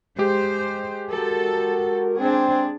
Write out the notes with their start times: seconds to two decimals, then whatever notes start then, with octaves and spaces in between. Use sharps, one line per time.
0.18 G#3 G4 C5
1.10 F#4 A4 A#4
2.18 C4 D4 G#4